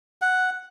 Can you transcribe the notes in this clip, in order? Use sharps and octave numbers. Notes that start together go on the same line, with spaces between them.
F#5